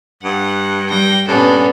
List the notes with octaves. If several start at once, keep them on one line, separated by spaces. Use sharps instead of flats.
G2 F#5
G3 G5 A#6
G2 A#2 B3 C#4 D4 A4